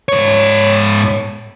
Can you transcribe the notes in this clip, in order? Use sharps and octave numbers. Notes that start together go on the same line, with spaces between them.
G#2 C#5